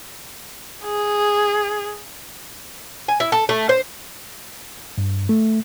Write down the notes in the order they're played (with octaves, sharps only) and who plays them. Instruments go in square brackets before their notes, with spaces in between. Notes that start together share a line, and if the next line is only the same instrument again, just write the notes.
[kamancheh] G#4
[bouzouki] G#5
E4
A4
A3
C5
[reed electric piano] G2
A3